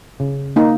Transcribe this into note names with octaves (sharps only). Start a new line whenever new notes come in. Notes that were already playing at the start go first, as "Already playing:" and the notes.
C#3
A#3 D#4